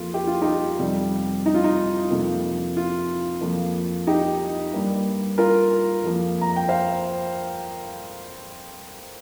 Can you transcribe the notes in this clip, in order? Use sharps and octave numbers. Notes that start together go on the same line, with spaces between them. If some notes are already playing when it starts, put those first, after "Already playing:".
Already playing: F2 F3 A#3 F4
G4
F4
D#4 G4
F2 C3 G3
D#4
F4
D#4
F2 C3 F3 A#3
F4
F2 F3 A#3
D#4 G4
G2 G3 A#3
F4 A#4
F2 F3 A#3
A#5
G5
C5 F5